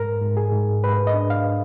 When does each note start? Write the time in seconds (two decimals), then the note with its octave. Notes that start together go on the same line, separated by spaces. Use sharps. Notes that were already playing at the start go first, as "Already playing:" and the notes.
Already playing: G#2 A#4
0.22 G#2
0.37 G#4
0.52 G#2
0.83 G#2 B4
1.07 D#5
1.14 D4
1.30 F5